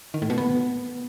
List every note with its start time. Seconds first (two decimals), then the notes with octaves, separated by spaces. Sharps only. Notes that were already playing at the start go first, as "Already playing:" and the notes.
0.14 D#3
0.22 A2
0.30 B2
0.38 B3